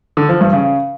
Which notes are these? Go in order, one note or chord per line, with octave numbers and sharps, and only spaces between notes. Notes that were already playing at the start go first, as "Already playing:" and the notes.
D3
F3
G2
C#3